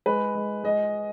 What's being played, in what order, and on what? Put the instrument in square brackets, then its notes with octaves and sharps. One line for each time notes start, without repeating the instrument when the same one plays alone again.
[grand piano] G#3 B4
G#3
G#3 D#5